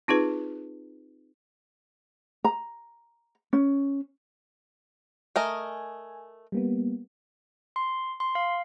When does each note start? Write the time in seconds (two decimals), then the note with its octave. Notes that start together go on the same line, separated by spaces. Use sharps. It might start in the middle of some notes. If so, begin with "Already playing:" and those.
0.08 C4 D#4 F4 G#4 B4
2.44 A#5
3.53 C#4
5.36 A3 A#4 D#5 G#5
6.52 G3 A#3 B3
7.76 C6
8.20 C6
8.35 F5